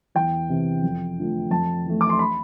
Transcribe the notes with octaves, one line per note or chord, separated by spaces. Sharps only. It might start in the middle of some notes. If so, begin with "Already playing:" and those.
E2 G5
C3 E3
F2
D3 F3 A3
F2 A5
E3 A3
D6
C6
B5